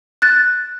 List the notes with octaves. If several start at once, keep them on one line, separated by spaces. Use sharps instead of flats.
F#6 A6